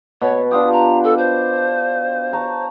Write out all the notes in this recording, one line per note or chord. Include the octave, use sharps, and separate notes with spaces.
B2 C#5
D4 F4 G4 D#6
A#5
A4
C5
C#5 A5 A#5